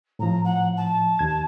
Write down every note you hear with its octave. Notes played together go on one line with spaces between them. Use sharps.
A2 F3 A#5
F#5
A5
D#2 G#6